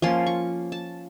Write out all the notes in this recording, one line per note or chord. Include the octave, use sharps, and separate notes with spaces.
F3 A#3 C#4 F4 C6
C#6
A5